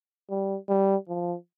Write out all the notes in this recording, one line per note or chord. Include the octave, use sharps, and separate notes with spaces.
G3
G3
F3